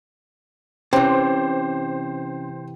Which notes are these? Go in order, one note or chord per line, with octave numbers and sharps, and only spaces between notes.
C3 E3 C#4 C5 G5